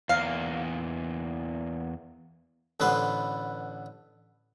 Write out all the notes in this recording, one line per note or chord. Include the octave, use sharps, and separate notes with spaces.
E2 A#3 F5
A1 D3 B3 B4 C5